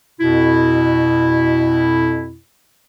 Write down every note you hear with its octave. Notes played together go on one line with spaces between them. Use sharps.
F2 B2 E4